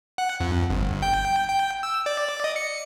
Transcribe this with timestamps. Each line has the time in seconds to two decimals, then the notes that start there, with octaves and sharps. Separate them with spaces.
0.18 F#5
0.40 F2
0.70 G1
1.02 G5
1.48 G5
1.83 E6
2.06 D5
2.44 D#5
2.56 C#7